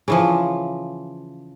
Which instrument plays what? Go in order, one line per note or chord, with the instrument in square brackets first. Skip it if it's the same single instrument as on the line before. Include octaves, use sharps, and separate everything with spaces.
[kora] C#3 E3 F3